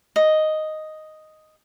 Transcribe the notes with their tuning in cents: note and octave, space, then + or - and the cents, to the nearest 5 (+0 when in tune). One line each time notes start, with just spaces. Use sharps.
D#5 +0